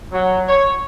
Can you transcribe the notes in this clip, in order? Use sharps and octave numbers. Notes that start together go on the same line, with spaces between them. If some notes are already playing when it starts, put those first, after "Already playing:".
F#3
C#5